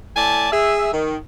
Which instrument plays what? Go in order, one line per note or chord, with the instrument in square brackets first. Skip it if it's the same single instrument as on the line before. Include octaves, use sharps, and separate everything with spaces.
[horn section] A2 D5 G#5 A5
G#4 E5
D#3